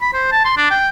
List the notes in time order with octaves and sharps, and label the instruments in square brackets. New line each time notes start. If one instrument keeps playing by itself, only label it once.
[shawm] B5
C5
A5
C6
D4
G5